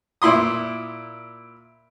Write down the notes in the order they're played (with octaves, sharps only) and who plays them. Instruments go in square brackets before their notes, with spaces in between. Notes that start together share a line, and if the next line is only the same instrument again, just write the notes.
[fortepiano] A#2 E4 C6 D#6